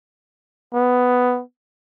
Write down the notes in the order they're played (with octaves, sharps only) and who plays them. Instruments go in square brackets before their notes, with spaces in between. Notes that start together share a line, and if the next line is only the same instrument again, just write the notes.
[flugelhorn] B3